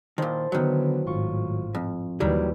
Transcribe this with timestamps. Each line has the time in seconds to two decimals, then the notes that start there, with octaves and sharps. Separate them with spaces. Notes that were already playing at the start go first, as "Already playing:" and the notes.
0.18 A#2 D#3 E4 C5 A5
0.52 D3 D#3 F#3 B3
1.07 G#1 A2 F4 C#6
1.75 F2
2.20 D#2 D#3 E3 F#3 G3